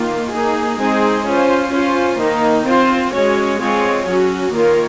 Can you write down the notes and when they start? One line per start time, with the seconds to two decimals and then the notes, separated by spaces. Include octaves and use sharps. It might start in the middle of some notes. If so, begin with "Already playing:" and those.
Already playing: D#3 A#3 F4
0.33 A#3 D#4 G#4
0.80 G#3 C4 D#4 G#4 C5
1.26 C#4 F4 C5
1.73 C#4 F4 C5
2.20 D#3 A#3 D#4
2.66 C4 F4 C5
3.13 G#3 C#4 F#4 C#5
3.60 G#3 C4 F4 G#4 C#5
4.07 F#3 C#4 F#4
4.53 D#3 A#3 F4 A#4 C#5